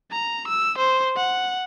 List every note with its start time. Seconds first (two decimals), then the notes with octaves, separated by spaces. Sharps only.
0.11 A#5
0.48 E6
0.79 C5
1.17 F#5